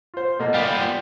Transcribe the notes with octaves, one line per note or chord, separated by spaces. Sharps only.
F4 C5
B2 A3 A#3
G3 B3 A#4 F5
F4